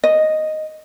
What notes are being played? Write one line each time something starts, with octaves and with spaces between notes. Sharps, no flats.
D#5